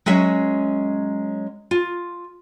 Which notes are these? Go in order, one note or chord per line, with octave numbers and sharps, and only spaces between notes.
F#3 G#3 C#4 E5
F4